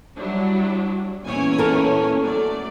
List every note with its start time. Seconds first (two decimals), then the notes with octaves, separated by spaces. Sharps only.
0.15 F#3 G3 D4 E4
1.25 E2 A#2 C#4 E4 C#5 G#5
1.58 A4 A#4
2.20 F#3 A3 D5